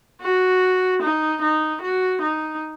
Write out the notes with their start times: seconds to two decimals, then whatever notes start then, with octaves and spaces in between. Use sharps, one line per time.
0.22 F#4
1.02 D#4
1.41 D#4
1.82 F#4
2.22 D#4